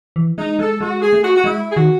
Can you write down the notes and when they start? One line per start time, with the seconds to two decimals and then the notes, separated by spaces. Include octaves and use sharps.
0.16 E3
0.38 G#3 D#4
0.59 G#3 A4
0.81 G#3 F#4
1.01 G#4
1.13 A3
1.23 F#4
1.36 F#4
1.44 G#3 E4
1.71 G#4
1.76 D#3 F#4